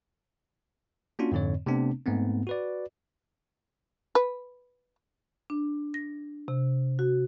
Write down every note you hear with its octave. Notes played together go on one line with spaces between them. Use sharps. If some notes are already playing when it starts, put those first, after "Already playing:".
A#3 C#4 D4 F4 F#4
F2 G#2 D3 C4 C#5
C3 A3 B3 C4 D4
G#2 A3 B3 C4
F#4 B4 D5
B4
D4
A#6
C3
F#4